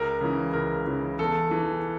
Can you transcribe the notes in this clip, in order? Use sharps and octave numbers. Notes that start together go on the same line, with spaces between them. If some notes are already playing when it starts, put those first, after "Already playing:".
Already playing: C#2 A#4
C#3 E3
C#2 A#4
C#3 E3
E2 A4
E3